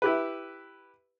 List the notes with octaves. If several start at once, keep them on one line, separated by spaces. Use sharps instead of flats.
E4 G4 B4